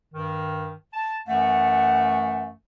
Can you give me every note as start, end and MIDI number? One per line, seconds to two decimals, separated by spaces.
0.13 0.72 43
0.13 0.72 51
0.94 1.19 81
1.28 2.52 42
1.28 2.52 52
1.28 2.52 57
1.28 2.42 78